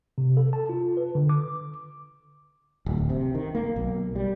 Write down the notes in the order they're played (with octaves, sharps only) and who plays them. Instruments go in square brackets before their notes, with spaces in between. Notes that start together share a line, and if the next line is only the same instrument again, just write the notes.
[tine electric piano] C3
A4
A5
F4
B4
D3
D6
[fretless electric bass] D1
C3
D#3
A#3
B1
G3